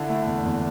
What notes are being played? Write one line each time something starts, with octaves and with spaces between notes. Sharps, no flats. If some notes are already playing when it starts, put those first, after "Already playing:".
Already playing: D3 E4
A3
E2
E2